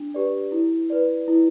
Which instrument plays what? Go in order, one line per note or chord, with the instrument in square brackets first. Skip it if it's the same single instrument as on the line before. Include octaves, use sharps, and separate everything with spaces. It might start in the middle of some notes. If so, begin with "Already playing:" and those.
Already playing: [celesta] D4
G4 B4 D5
E4
B4 D5
E4